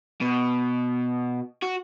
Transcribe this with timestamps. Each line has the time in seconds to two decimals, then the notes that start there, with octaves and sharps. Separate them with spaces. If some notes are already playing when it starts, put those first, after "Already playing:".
0.21 B2
1.62 F#4